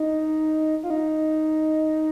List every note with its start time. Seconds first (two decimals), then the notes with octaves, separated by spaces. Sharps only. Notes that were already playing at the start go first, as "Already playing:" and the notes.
Already playing: D#4
0.83 F4
0.90 D#4